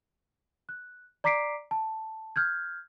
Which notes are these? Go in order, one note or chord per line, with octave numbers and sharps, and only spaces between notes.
F#6
D5 A#5 D6 B6 C7 D7
A5
F6 G6 G#6